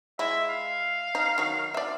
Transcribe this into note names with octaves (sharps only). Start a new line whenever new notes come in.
G#3 E4 E5
F5
D#4
D#3 F#3
D5 E5